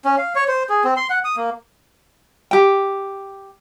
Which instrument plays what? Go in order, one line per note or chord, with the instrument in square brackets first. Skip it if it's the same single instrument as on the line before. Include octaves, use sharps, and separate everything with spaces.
[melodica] C#4
F5
C#5
C5
G#4
C4
C6
F#5
D#6
A#3
[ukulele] G4 G5